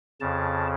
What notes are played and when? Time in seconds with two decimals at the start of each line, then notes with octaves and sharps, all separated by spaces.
0.20 F2 C#3 A5